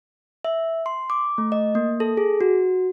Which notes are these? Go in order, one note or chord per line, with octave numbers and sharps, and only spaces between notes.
E5
C6
D6
A3
D#5
A#3
A4
G#4
F#4